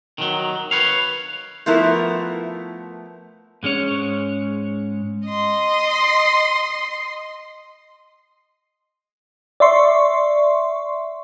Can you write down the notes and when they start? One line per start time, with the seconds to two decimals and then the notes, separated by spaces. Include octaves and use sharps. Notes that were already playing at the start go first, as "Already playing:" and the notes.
0.18 D#3 F3 F#3
0.71 B4 C#5 F5
1.66 F3 A3 B3 E4 A#4
3.63 G#2 G#3 C#4 C#5
5.28 D#5 C6
9.60 D5 E5 C6 C#6